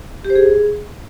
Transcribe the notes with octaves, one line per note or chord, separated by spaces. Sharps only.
G4
C5
G#4